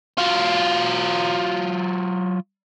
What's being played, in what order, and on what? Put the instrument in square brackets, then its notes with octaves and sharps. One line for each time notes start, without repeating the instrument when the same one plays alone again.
[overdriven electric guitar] F#3 F4